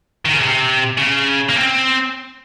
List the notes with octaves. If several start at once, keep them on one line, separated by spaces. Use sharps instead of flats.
D#3
C#3
C3
C#3
A#3
C4